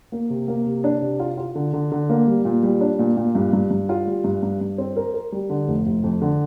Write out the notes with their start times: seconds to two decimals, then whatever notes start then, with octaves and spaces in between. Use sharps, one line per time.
0.12 A#3
0.30 C3
0.48 A#3
0.66 C3
0.84 D4
1.02 C3
1.20 F4
1.38 F4
1.55 D3
1.74 D3
1.92 D3
2.09 A#3
2.27 G3
2.45 A#2
2.63 G3
2.81 D4
2.99 A#2
3.17 A#2
3.35 G2
3.53 G2
3.71 G2
3.89 F4
4.07 G3
4.24 G2
4.43 G2
4.61 G2
4.78 C4
4.97 A#4
5.14 A#4
5.32 G3
5.50 D3
5.68 F1
5.86 F1
6.04 F2
6.22 D3